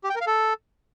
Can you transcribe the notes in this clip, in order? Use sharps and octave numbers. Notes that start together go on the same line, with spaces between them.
G4
G5
A#4
F5
A4